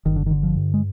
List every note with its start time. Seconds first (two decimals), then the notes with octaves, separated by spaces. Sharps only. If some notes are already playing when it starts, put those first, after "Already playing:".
0.06 G1 D#3
0.16 D3
0.26 D#3
0.31 D3
0.43 F3
0.56 G2
0.74 G#3